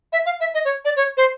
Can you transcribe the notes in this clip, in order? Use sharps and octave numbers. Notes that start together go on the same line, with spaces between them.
E5
F5
E5
D#5
C#5
D5
C#5
C5